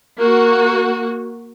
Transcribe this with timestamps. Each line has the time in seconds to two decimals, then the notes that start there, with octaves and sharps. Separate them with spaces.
0.18 A#3 F#4